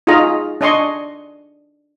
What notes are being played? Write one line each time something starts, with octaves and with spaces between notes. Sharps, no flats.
D#4 F4 F#4 G#4 D#5 A#5
D4 D5 D#5 G#5 C6 C#6